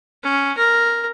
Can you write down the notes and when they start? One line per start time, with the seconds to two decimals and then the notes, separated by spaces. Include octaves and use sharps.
0.24 C#4
0.57 A#4